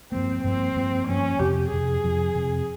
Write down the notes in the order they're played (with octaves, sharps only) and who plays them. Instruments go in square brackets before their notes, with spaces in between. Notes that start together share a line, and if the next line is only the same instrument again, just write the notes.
[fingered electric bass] G2 F3 A#3 [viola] C4
[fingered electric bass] G2 F3 A#3 [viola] C4
[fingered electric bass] G2 F3 A#3
[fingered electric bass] G2 F3 A#3 [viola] C#4
[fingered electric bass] F2 C3 F3 [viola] G4
[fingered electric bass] F2 C3 F3 [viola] G#4
[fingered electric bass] F2 C3 F3
F2 C3 F3